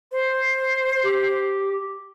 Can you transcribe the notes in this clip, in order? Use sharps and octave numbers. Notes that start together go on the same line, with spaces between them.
C5
G4